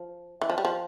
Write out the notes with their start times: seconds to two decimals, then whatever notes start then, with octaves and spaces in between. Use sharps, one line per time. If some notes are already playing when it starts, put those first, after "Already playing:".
Already playing: F3
0.42 E3
0.50 F3
0.58 G3
0.65 F3